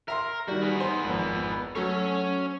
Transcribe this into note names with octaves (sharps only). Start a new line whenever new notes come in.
A#4 E5 A#5 C6
D#3 G3 F#4
B3 G#4
D#4 C5
G#1 F2
F#3 A3 C#4 C#5